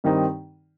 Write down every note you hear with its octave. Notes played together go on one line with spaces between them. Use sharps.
G2 D#3 C4 D#4